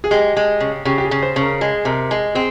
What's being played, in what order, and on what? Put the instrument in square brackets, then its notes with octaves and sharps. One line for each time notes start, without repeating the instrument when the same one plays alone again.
[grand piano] G#4
[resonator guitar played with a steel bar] G#3 [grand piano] G4
[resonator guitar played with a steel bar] G#3
C#3
[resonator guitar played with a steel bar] C#3 [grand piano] G4
[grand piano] G4
G#4
[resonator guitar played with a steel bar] C#3
[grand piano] C5
[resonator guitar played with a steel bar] C#3
[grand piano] A#4
[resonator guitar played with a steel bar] G#3 [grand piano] G#4
[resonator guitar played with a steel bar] C3 [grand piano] A#4
[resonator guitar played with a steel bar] G#3 [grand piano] G#4
[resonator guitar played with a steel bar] C4 [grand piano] G#4